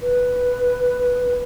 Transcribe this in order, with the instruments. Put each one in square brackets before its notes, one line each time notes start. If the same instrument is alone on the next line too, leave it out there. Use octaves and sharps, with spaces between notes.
[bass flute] B4